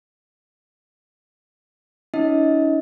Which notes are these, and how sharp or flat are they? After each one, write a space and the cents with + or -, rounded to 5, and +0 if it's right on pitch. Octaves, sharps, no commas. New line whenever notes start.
C#4 +45 E4 -45 D#5 +30